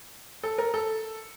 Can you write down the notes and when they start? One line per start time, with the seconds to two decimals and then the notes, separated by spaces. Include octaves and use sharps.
0.43 A4
0.58 A#4
0.74 A4